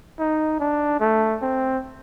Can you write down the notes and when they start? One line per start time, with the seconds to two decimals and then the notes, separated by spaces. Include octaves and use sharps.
0.19 D#4
0.60 D4
1.00 A3
1.41 C4